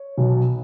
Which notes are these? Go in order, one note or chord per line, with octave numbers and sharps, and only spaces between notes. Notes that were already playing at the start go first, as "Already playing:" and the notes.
Already playing: C#5
B1 B2 F#3